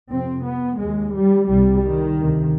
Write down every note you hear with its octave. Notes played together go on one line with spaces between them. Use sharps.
F2 C3 C4
B3
D#2 G#3
G3
C2 C3 G3
D#3
D2 C3